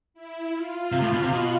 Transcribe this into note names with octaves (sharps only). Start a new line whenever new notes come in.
E4
F4
C3
A2
B2
C3
B2